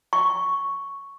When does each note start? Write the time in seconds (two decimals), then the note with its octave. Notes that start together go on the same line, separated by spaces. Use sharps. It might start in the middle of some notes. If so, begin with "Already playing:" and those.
0.13 C#6